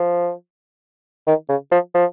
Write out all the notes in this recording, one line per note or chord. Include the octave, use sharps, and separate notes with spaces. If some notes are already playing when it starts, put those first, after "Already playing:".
Already playing: F3
D#3
C#3
F3
F3